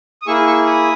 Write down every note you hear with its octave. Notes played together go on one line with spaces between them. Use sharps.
D#6
A#3 E4 G#4 C#6 E6
C#6 E6
B5 D#6